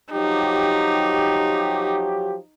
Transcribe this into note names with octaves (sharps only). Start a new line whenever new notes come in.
F3 F#3 D#4 G4